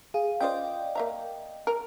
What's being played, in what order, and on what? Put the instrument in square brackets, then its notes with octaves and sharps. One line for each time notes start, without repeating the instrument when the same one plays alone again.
[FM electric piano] G#4 [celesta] F5
[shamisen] C#4 F4 C5 [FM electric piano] D5 D#5 G5
[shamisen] A#3 E5 A#5
A#4